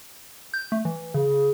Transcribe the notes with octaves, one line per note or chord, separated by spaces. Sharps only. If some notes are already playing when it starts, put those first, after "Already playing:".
G6
A3
E3
C#3 G#4